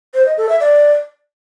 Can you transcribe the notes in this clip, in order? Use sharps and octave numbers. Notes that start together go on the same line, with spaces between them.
C5
D#5
A4
E5
D5